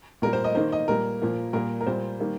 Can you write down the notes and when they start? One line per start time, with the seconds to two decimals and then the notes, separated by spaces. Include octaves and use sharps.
0.22 A#2 G3 A#3 A#4
0.33 C5
0.44 D#5
0.55 D#3 A#3 C5
0.72 D#5
0.88 A#2 G3 A#3 A#4
1.22 A#2 F3 A#3
1.53 A#2 G3 A#3 A#4
1.81 A#4
1.86 A#2 G3 A#3 C5
2.19 D#3 G3 A#3